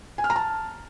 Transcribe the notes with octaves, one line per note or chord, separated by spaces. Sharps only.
G#5
F6
A#5
A5